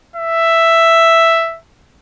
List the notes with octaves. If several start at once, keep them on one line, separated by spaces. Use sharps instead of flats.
E5